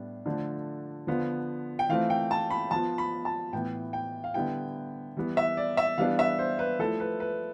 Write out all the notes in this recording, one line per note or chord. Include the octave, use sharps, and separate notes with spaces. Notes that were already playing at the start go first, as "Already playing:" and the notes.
Already playing: A2 G3 B3 D4
D3 F3 A3 D4
D3 F3 B3 F4
G5
E3 A3 C4 F4 F5
G5
A5
B5
F3 B3 F4 A5
B5
A5
A2 E3 B3 G5
G5
F5
D3 G3 B3 E4 G5
E3 G3 B3
E5
D5
E5
E3 G3 B3 D4 F5
E5
C5
B4
F3 A3 E4 A4
B4
B4